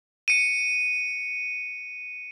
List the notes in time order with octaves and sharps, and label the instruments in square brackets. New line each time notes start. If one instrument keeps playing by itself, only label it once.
[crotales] C#7 D#7